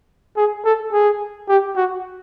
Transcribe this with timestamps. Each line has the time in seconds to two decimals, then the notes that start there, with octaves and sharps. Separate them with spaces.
0.37 G#4
0.65 A4
0.93 G#4
1.48 G4
1.76 F#4